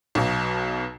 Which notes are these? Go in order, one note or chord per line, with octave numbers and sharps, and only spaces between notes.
B1 B2